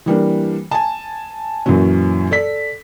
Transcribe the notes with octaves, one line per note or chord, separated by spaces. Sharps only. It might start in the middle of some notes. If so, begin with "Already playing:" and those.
E3 G3 A#3 D4
G#5 A5
F#2 A#2 E3 F#3 C#4
A4 D5 B6